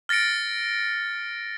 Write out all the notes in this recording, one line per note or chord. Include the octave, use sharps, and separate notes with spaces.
F6 A6 A#6 C#7 D7